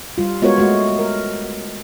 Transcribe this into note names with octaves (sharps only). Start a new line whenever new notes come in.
G3 F4
G#3 B3 F4 F#4 A#4 C#5
G#3 A3 F#4
A#4